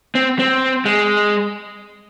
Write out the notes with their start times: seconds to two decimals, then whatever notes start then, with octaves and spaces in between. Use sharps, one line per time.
0.15 C4
0.39 C4
0.85 G#3